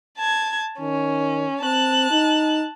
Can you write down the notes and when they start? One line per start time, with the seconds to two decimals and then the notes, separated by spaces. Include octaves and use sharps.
0.18 A5 G#6
0.80 D#3 C#4
1.62 C4 A5 F#6
2.11 D#4